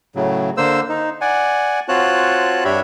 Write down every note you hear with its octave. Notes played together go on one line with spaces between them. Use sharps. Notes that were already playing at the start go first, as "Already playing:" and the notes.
A2 C#3 F#3
D3 A#3 C5 E6
D#4
D5 F#5 G#5
C4 F4 F#4 C#5 A5 F#6
G2 D4 G4 C#5 E5 B5